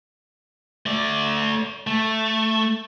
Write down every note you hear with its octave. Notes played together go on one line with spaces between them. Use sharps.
A3 D5
A3